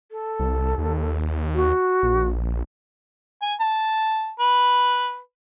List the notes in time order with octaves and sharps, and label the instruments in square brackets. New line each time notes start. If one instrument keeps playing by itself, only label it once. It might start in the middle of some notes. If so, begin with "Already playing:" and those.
[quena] A4
[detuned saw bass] C2
D#2
[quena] F#4
[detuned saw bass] A#1
[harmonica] G#5
A5
B4